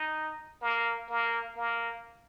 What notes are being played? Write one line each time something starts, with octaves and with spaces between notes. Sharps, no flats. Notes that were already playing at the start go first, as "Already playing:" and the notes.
Already playing: D#4
A#3
A#3
A#3